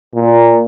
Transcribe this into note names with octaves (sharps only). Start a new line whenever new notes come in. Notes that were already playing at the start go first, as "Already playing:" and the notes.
A#2